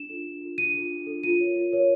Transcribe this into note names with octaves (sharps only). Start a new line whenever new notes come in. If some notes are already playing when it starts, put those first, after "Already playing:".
Already playing: D4 E7
F4 A4
D4
F4 A4
D4 D#7
F4 A4
D4
F4 A4
F4 D#7
A#4 C#5
F4
A#4 C#5